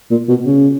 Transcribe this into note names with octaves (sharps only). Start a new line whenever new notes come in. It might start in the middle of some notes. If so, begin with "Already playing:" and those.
A#2
B2
C#3